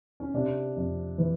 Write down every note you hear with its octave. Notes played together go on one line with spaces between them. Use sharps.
C#4
C3 D4
F2
E3